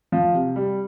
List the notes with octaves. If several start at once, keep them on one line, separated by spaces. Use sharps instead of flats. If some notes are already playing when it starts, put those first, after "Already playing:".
F3
C3
G3